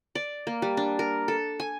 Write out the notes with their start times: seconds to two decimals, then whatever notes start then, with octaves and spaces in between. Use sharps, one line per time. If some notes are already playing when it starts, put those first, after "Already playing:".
0.15 D5
0.47 A#3
0.62 G3
0.77 D4
0.99 A#4
1.28 A4
1.60 G#5